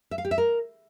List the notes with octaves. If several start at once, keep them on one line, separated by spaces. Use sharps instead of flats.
E5
F5
G4
E5
A#4